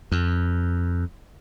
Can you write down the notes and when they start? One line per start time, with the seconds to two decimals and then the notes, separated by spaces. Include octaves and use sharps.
0.12 F2